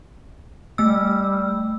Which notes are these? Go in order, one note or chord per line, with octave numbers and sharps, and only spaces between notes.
G3 A3 E6